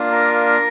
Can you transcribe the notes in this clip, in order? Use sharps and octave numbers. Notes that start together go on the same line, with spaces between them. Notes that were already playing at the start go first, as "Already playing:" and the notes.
Already playing: A#3 D4 F4
A#4